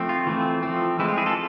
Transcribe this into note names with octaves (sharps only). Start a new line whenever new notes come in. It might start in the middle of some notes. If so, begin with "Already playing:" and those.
Already playing: F3 A3 C4
F4
E3 A3 C4
F3 A3 C4
E3 G#3 C4 E4
F4
E4 G#4
F4 A4